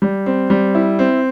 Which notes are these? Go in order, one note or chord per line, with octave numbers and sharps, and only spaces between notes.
G3
C4
G3
E4
C4